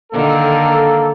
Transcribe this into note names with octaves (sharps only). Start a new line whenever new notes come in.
D3 D#3 A#3 A4